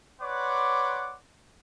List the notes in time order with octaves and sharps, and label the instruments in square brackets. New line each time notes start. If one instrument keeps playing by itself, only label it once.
[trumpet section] B4 C#5 D5 F#5 C6 D6